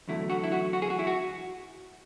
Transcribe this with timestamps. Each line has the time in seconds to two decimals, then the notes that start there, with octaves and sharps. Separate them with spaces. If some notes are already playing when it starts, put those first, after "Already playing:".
0.08 E2 D3 F#3 A3 E4
0.30 F#4
0.43 E4
0.52 F#4
0.73 F#4
0.82 G#4
0.90 F#4
0.99 E4
1.07 F#4